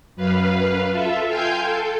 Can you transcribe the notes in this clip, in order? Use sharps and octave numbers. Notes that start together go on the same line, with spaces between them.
F#2 B4 F5
F4 A4 E5
F5 G5 G#5 C6 G6
A4